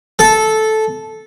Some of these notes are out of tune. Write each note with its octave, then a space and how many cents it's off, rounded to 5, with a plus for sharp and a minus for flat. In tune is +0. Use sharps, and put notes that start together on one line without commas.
A4 -10